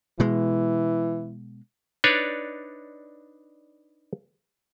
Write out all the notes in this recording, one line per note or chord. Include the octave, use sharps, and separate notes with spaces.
B2 E3 G#3
D4 D#4 B4 C#5 D5